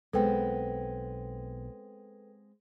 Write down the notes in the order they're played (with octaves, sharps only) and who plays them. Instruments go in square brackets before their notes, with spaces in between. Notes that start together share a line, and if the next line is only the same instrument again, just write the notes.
[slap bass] B1 [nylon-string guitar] G#3 B3 C4 [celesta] A4 B4 G5